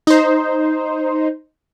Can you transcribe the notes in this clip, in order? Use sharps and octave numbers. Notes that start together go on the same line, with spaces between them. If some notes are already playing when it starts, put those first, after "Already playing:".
D#4 C5